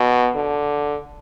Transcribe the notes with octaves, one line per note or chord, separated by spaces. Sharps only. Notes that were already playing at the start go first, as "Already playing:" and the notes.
Already playing: B2
D3